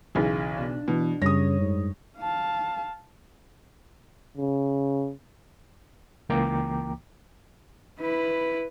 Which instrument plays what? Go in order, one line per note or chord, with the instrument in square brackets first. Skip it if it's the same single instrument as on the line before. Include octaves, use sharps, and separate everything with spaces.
[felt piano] B1 C#3 E3
[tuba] B2 [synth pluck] D4
[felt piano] B2 [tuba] E3
[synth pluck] F#2 G3 C#5 [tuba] C#3 [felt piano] D#6 A#6
[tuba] G#2
[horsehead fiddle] F5 A5
[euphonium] C#3
[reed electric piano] C#2 E3 A#3 G5 A#5 D6
[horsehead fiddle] E4 B4